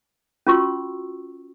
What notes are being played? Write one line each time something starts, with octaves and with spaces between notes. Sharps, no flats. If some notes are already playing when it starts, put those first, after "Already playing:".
C#4 F4 F#4 C#6 E6